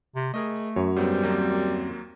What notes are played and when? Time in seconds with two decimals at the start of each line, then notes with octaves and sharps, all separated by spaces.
0.15 C3
0.34 A3 G#4 A#4 D#5
0.76 F#2 C#5
0.96 G#2 G3 B3 C4
1.23 D#2 F#3 A#3 C4